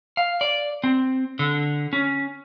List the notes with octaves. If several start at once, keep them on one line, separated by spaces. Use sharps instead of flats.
F5
D5
C4
D3
C#4